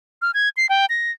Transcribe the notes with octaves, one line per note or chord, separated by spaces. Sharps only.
F6
G#6
C7
G5
A#6